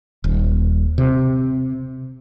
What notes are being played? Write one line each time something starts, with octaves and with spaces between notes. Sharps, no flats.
D#1
C3